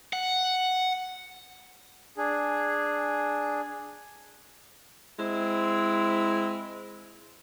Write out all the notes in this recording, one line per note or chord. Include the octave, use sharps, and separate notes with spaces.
F#5
D4 G#4
G#3 C4 E4